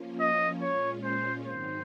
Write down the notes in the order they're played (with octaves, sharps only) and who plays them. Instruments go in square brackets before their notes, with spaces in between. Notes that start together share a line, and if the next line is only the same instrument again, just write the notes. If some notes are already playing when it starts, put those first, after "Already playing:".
Already playing: [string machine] F3 A#3 C#4 F4
[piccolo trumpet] D#5
[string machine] A#2 G#3 C#4 F4 [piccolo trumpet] C#5
[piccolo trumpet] C5
[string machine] G#2 D#3 F#3 C4 D#4 [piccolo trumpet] C5